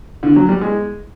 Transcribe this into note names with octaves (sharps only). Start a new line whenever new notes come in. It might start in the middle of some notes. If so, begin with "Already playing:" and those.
D3
F#3
G3
G#3